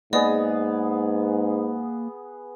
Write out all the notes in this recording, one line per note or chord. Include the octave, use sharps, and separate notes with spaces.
G#2 A#3 B3 G#4 D5 D#5